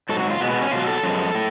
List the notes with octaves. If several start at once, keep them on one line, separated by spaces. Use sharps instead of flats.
G#2 F#3 A4
F#4
F4
B2 G#3 B3
B3
C#4
B2 F#3 F4
A4
F#2 F3 G#3
A2